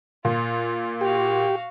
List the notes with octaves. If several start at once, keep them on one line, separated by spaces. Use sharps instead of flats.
A#2 F4
F#4 G4 F5